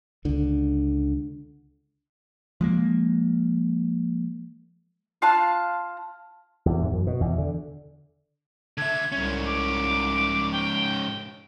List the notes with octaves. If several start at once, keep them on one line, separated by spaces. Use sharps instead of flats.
C#2 D3
F3 G#3 A#3
F4 F5 A5 F#6
E2
G#2
F#2
B2
E2
D3
D3 E5 G#6
C2 G#2 C#4 G#6
D6
G5